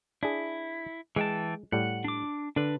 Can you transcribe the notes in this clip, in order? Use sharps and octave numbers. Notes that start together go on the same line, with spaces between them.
D4 E4 G#4
E3 G#3 G5 A5
A2 G3 F#5
D4 D6
D3 D4 B4